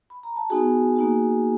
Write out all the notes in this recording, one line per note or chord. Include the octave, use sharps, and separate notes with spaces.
B5
A#5
A5
B3 D#4 F#4 G#4 G#5
A#3 D#4 F#4